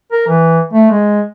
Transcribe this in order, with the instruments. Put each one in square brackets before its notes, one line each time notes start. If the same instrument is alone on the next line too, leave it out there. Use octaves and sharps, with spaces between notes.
[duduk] A#4
E3
A3
G#3